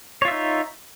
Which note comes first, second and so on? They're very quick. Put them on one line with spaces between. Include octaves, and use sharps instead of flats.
C#5 F4 E5 D#4